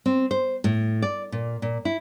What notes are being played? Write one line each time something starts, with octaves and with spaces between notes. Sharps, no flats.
C4
C5
A2
D5
A#2
A#2
E4